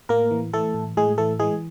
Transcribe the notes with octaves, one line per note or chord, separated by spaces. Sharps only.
A2 A#3 A#4
E3
E3 A3 A4
A2
A2 G#3 G#4
E3 A3 A4
E3 G#3 G#4